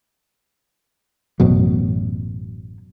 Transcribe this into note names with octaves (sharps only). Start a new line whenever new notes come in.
A1 F#2 B2 F#3